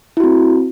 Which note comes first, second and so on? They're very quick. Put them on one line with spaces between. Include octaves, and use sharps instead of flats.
E4 F#4 C4